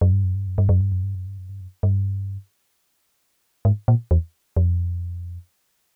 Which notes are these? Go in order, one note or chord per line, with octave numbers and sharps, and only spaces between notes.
F#2
G2
F#2
G2
F#2
G2
F#2
G2
F#2
G2
F#2
G2
F#2
G2
F#2
G2
G#2
A#2
E2
F2